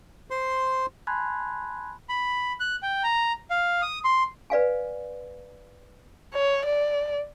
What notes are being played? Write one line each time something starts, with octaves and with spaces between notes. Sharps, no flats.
C5 C6
G#5 A5 B5 C6 F#6 G#6
B5
F#6
G5
A#5
F5
D#6
C6
B4 D5 F5 G#5
C#5
D5